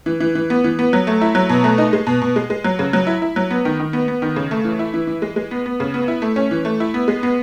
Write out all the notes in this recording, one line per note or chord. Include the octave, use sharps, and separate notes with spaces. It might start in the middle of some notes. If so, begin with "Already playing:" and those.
E3
E3
E3
B3
E3
B3
F#3
A3
E4
F#3
B2
A3
D#4
G#3
B2
B2
G#3
G#3
F#3
C#3
F#3
E4
E4
F#3
B3
D#3
D#3
B3
B3
D#3
C#3
A3
E3
E4
E3
E3
G#3
G#3
B3
B3
C#3
B3
E4
A3
C#4
E3
A3
E4
B3
G#3
B3